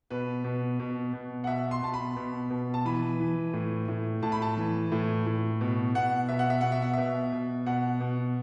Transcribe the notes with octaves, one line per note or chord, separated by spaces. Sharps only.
B2 B4
B2
B2
B2
F#5
B2 E5
C6
B2 A5
B5
B2
B2
A5
E3 B5
E3
A2
A2
A2 A5
B5
A5
E3
A2
A2
B2
B2 F#5
B2 E5
F#5
E5
B2 F#5
E5
F#5
B2 E5
B2
B2 F#5
B2